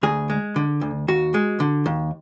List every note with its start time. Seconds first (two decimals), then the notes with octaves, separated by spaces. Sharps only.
0.03 D2 G#4
0.30 G#3
0.56 D3
0.81 D2
1.08 D#2 F#4
1.34 G#3
1.60 D3
1.86 D#2